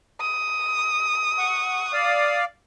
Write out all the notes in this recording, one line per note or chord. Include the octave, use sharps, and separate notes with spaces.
D#6
F#5 C#6
D5 F5